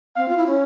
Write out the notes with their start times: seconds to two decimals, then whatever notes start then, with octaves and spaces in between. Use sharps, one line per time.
0.16 C4 F5
0.28 F4
0.37 E4
0.47 C#4